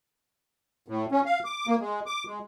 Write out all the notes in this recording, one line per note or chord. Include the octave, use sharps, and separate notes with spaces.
A2
C#4
F5
D6
A#3
G#3
D6
G#3